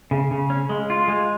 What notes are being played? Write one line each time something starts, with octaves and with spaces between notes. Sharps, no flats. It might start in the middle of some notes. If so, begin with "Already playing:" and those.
C#3
C#3
C#4
G#3
F4
G#3